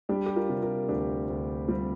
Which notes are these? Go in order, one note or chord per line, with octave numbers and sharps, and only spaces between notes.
G3 D4 G4
G4
F4 A#4
C3
F4 A#4
D2 D4 G4
D2
G3 C4 F4